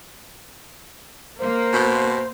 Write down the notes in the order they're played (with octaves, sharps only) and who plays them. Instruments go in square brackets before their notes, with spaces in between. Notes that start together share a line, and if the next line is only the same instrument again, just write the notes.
[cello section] A#3 [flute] C5
[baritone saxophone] B2